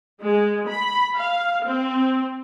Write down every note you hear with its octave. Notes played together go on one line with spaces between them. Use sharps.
G#3
B5
F5
C4